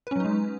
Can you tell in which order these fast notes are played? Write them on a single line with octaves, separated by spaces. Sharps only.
B4 C#4 F#3 D#4 G#3